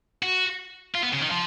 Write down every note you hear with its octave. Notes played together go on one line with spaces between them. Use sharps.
F#4
F4
B3
C#3
D#3
F3